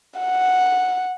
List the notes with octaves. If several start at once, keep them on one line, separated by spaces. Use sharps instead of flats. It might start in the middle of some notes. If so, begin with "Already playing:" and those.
F#5